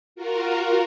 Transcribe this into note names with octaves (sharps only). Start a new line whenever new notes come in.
F4 F#4 A#4